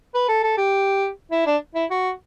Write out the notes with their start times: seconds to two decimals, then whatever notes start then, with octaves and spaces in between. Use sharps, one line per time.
0.15 B4
0.29 A4
0.44 A4
0.58 G4
1.32 E4
1.46 D4
1.75 E4
1.90 F#4